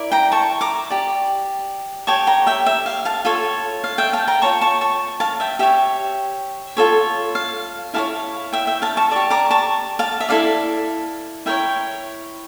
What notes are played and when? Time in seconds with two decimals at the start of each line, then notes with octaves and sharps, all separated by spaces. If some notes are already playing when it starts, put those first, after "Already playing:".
Already playing: E4 A#4 D5
0.12 G5 A#5
0.32 A5 C#6
0.61 A#5 D6
0.90 G4 D5
2.07 G4 C#5 A5 C#6
2.27 G5 A#5
2.47 E5 G5
2.66 E5
2.86 F5
3.05 F5 A5
3.25 F4 A4 C#5
3.84 F5
3.98 E5 G5
4.13 F5 A5
4.28 G5 A#5
4.42 F4 C#5 A5 C#6
4.61 A5 C#6
4.81 A5 C#6
5.20 F5 A5
5.40 E5 G5
5.59 G4 C#5 E5
6.77 F4 A4 C#5
7.35 F5
7.94 E4 G4 C#5 F5 A5
8.52 E5 G5
8.67 E5 G5
8.82 F5 A5
8.97 A5 C#6
9.11 G4 D5 A5 C#6
9.30 A#5 D6
9.51 A5 C#6
9.99 F5 A5
10.20 E5
10.29 E4 A4 D5 F5
11.46 E4 A#4 C#5 E5 G5